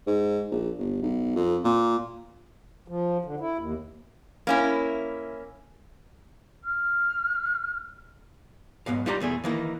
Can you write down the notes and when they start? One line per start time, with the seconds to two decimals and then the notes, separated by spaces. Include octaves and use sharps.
0.07 G#2
0.51 A#1
0.78 G1
1.02 B1
1.36 F2
1.64 A#2
2.88 F3
3.24 D3
3.40 E4
3.58 D#2
4.47 A#3 C#4 E4
6.64 F6
8.86 B1 G#2 B3 F5
9.06 G3 F4 G4 D5 A#5
9.20 E2 B2 A3 G#4
9.44 D#3 E3 A#3